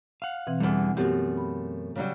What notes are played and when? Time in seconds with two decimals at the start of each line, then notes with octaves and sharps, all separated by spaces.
0.22 F5 F#5
0.47 B2 E3 C4
0.60 E2 D3 G3
0.97 F#2 A3 B3 C4 F#4 G4
1.37 B5
1.96 C#3 F#3 G3